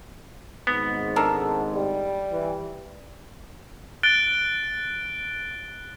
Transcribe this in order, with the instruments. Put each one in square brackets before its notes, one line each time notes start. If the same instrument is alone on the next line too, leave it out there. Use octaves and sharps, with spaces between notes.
[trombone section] G#1 G#2 [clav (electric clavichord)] B3
[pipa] D4 A4 A#4
[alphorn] G3
[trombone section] E3
[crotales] F#6 A6 D7 G7